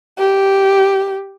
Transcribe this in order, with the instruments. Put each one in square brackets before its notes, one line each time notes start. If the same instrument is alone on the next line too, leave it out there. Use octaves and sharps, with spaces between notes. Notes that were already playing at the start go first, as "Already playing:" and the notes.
[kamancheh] G4